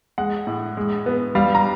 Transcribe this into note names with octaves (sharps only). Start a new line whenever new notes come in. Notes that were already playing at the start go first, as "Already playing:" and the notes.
G#3 F#5
A2
G#3
B3
G3 F5
A#5